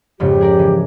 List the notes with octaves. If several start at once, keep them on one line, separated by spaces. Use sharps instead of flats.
F2 G#2 C#3 G4
G#4 A#4 D5
E3